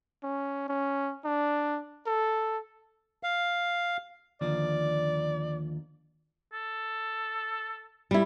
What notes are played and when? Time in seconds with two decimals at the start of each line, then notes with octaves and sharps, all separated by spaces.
0.23 C#4
0.68 C#4
1.25 D4
2.07 A4
3.23 F5
4.41 D#2 D3 F3 D5
6.53 A4
8.11 G3 E4